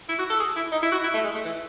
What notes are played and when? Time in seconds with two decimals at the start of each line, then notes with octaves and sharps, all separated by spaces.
0.09 E4
0.19 F#4
0.30 A4
0.40 G#4
0.56 E4
0.72 D#4
0.83 E4
0.92 F#4
1.03 E4
1.14 A3
1.24 G#3
1.35 A3
1.45 E3